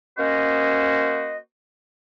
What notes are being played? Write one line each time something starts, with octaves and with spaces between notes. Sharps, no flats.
A#3 C#4 F#4 C5 D#5